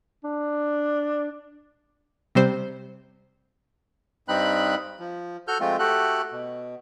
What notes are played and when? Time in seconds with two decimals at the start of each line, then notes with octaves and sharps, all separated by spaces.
0.24 D4
2.35 C3 G3 C4 C5
4.28 G2 G3 C4 D#4 B5 F#6
4.99 F3
5.48 F#4 A4 F6 G6
5.60 F3 G#3 A3 C4 F4
5.79 A3 F#4 G4 A4 F#6
6.32 B2